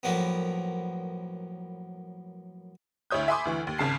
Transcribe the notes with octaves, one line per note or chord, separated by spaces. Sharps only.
F#2 A2 F3 A#3 B3
D2 E4 C#5 D#6 G6
E5 G#5 B5 C6 D6 D#6
D2 E3 C#6
D#2
G#1 C#3 A5 C7